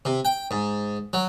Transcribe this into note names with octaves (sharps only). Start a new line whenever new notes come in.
C3
G5
G#2
F#3